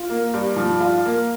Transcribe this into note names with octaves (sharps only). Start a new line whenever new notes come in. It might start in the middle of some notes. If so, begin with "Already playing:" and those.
Already playing: F4
A#3
G2
F3
F4
A#3